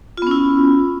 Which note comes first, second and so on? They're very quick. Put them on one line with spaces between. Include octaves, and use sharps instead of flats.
F4 B3 C#4 E4